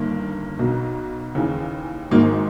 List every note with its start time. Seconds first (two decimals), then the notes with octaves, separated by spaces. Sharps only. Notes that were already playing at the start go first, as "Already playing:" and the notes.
Already playing: G1 G2 D#3 A#3
0.59 B1 B2
1.35 D#2 C#3 E3
2.11 G#1 G#2 D#3 A#3